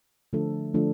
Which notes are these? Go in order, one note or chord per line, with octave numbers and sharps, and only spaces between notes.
D3 F3 A3 D4 A4
D3 F3 A3 D4 A4